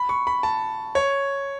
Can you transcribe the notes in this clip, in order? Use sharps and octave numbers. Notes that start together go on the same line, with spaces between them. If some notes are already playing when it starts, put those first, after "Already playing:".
Already playing: B5
C#6
B5
A5
C#5